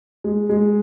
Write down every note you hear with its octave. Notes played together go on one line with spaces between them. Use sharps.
G#3
G#3